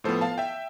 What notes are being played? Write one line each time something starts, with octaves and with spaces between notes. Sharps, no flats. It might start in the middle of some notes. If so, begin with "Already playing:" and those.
A2 F3 B3 A4 C5
F5 A5
E5 G5